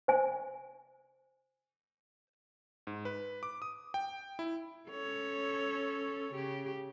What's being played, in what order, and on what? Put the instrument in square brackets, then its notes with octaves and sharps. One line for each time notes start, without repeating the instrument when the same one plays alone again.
[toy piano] C5 G#5
[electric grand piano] G#2
B4
D6
D#6
G5
E4
[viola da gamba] C#4 A4 C#5
C#3 G4